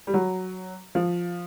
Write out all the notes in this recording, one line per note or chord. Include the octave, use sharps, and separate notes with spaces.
G3
F#3
F3